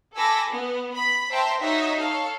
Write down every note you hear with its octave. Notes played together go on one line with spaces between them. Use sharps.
A4 G#5 B5 D6 E6 A#6
B3
B5
C5 E5 G5 A5 A#5 C6
D#4 F#4 C#5 E5
A4 C#5 F5